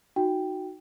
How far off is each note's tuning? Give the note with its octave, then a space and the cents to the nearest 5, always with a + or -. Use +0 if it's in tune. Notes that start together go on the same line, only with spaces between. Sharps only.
D#4 +0 F#4 +0 G5 +0